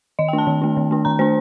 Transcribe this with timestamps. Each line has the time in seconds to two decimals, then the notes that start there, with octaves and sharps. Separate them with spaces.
0.19 D#3 D#5
0.28 G5
0.33 A3 D4
0.38 A5
0.47 D#3
0.62 A3 D4
0.77 D#3
0.91 A3 D4
1.05 D#3 A#5
1.19 A3 D4 C5